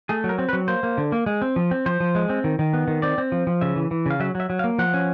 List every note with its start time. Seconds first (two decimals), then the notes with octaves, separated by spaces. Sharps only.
0.09 A3 G#4
0.24 F#3
0.29 A#4
0.38 C4
0.49 B4
0.53 F#3
0.68 A#3 C5
0.83 A#3
0.98 D3
1.12 A#3
1.26 G#3
1.42 C4
1.56 F3
1.71 C4
1.86 F3 C5
2.00 F3
2.15 G#3
2.29 C4
2.44 D#3
2.59 D#3
2.73 B3
2.88 D#3
3.02 C4 D5
3.18 C4
3.32 F3
3.47 F3
3.61 C#3 E5
3.76 E3
3.91 E3
4.06 C#3 F5
4.20 F#3 E5
4.35 F#3 E5
4.50 F#3
4.59 F5
4.64 A#3
4.79 F3 F#5
4.94 C#4